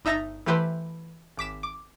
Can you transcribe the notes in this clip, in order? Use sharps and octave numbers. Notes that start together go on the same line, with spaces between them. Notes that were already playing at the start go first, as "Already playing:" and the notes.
G1 D#4 E5 A#5 A6 A#6
E3 A3 G4 B4 C5
G#1 D6 B6 E7
D6